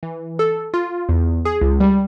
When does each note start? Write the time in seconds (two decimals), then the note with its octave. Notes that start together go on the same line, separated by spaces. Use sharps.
0.03 E3
0.39 A4
0.74 F4
1.09 E2
1.45 G#4
1.61 C#2
1.80 G3